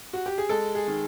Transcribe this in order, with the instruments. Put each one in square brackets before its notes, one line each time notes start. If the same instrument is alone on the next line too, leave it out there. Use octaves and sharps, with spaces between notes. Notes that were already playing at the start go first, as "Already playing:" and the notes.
[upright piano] F#4
G4
G#4
G#3 A4
G#4
D#3